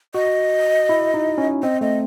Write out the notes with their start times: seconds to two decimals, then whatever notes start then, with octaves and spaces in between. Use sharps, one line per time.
0.14 F#4 D#5
0.89 E4
1.14 D#4
1.38 C#4
1.63 C4 D#5
1.81 A3 D#5